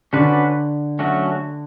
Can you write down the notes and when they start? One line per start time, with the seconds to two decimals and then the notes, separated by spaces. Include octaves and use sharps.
0.13 D3 C#4 F#4 B4 D5
0.99 F#3 A3 C#4 F#4